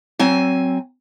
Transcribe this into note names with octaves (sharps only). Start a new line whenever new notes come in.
F#3 C4 G#5